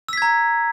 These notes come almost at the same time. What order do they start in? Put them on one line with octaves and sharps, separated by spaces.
E6 B6 G#6 A#5